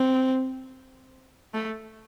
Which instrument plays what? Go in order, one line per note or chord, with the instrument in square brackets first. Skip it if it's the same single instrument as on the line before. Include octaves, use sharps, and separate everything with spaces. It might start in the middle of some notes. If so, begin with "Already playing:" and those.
Already playing: [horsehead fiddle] C4
A3